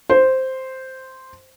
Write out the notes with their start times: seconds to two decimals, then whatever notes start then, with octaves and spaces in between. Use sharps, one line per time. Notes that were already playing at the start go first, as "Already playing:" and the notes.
0.09 C5